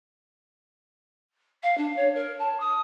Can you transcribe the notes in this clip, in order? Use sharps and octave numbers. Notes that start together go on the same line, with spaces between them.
F5
D4
C#5
A#4
A5
D#6